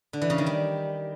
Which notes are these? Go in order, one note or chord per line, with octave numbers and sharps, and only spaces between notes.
D3
E3
C#3
D#3
G3